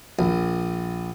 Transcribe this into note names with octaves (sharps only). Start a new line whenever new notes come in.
A#1